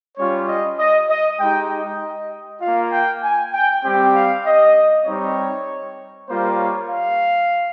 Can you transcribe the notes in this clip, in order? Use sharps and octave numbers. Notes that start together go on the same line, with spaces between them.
G3 C#4 F4 C#5
D#5
D#5
D#5
G#3 D#4 G4 G5
D#5
A#3 F4 F5
G5
G#5
G5
G3 C4 G4 G5
F5
D#5
G3 C4 D#4 G4 C#5
G3 A#3 F4 C5
C#5
F5